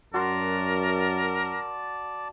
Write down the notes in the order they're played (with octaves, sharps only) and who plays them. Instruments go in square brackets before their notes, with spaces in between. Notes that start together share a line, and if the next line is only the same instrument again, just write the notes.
[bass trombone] F#2 [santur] F#4 C6 [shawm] A#4 [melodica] D5 A5